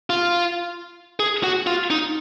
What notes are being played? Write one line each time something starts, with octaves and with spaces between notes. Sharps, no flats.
F4
G#4
F#4
F4
D#4